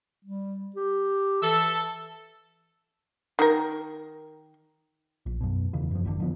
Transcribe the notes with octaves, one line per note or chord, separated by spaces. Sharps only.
G3
G4
E3 A4 E5
D#3 A#4
A#1
F#2 B2
E2 C#3 E3
F#2 F3
G#1 F#2 B2 D3
D3 F3 B3